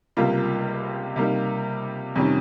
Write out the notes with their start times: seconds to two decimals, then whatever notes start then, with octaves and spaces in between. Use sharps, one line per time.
0.17 C#2 C3 G3 A#3 F4
1.16 C3 G3 A#3 D#4
2.15 F2 C3 D#3 G3 C#4